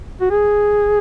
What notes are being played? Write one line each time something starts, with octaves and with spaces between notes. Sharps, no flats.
F#4
G#4